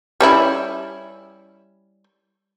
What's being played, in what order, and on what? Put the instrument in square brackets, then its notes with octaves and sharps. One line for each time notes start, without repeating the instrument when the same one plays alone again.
[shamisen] G3 C#4 E4